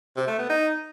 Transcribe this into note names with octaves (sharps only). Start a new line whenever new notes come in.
C3
A3
B3
D#4